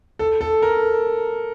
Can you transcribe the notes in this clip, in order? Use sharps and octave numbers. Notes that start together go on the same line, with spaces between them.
A4
A4
A#4